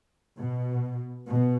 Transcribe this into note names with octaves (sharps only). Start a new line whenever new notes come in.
B2
B2